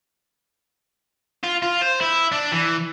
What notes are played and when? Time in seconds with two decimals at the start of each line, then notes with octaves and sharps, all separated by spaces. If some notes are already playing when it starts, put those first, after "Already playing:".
1.44 F4
1.63 F4
1.82 C5
2.01 E4
2.32 D4
2.52 E3